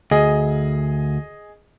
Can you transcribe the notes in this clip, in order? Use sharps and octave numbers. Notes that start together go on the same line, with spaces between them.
D2 G#4 D#5